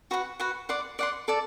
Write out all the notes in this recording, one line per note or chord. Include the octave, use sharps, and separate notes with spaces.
F#4 B4 F#5
F#4 B4 F#5
D5 F#5 C6
D5 F#5 C6
A4 D5 A5